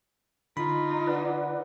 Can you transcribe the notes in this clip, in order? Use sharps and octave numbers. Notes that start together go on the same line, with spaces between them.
D3 D#4 F4 B5
B4 D5 F#5